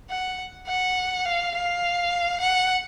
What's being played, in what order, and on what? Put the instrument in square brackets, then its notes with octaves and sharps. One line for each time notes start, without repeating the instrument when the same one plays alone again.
[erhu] F#5
F#5
F5
F5
F#5